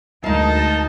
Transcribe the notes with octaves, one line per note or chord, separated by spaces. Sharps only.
D2 G#3 D#4 A#4 F5 A5